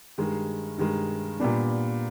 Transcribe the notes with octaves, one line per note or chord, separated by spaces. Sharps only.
G2 D#3 G#3
G2 D#3 G#3
A#2 G3 B3 D4